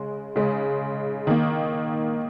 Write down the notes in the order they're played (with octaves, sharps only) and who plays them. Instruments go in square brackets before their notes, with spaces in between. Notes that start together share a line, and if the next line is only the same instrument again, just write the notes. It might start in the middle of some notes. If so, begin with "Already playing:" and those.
Already playing: [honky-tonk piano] C#3 G#3
C#3 G#3
D#3 A#3